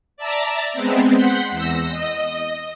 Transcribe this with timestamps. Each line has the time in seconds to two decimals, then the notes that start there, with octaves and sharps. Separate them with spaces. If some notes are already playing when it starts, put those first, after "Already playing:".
0.17 D5 E5 A5 A#5
0.73 G#3 B3 C4
1.13 F#5 C6 G6 B6
1.52 E2 E6 A#6
1.91 D#5